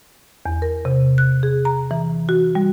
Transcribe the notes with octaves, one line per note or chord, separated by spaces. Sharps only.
E2
A#4
C3
F#6
G#4
A#5
E3
F#4
G3